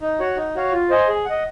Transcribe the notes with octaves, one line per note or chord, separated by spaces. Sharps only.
D#4
F#4 C#5 F#5
D#4
F#4 C#5 F5
F4
C5 D#5 G#5
G#4
D#5 F#5